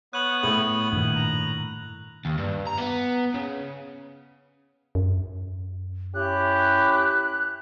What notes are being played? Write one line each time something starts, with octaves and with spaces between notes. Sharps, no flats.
B3 C#5 D#6 F#6 F#7
A2 F#7
G2 A#2 D#3
A#5
D#2
G2
A#5
B3
C#3
F#2
C#4 E4 G4 F#6